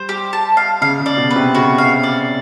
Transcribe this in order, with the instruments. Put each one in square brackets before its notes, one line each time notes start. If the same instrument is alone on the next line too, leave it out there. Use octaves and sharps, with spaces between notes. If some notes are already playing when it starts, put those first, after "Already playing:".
Already playing: [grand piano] G3 [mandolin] C5
[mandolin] G4
A5
F5
[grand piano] C#3 [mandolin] F5
[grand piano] C#3
[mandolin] D5
[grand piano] B2
[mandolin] B4
[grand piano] C3
[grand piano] C#3 [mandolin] F#4
[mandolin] F5
D5